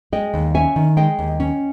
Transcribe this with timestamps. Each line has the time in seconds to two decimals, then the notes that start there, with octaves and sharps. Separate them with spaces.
0.12 G#3 D#5 G5
0.34 D#2
0.54 C#4 E5 G#5
0.76 D#3
0.97 G#3 D#5 G5
1.19 D#2
1.40 C#4